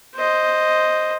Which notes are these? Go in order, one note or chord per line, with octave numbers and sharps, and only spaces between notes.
C5 D#5